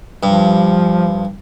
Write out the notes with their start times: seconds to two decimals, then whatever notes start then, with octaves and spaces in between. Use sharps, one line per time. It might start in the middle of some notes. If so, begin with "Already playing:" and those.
0.23 G2 F3